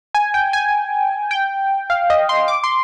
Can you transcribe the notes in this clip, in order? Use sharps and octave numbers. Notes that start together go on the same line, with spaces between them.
G#5
G5
G#5
G5
F5
D#5
C6
D6
C6